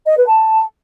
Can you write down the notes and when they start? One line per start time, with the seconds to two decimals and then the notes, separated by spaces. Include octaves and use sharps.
0.07 D#5
0.18 B4
0.28 A5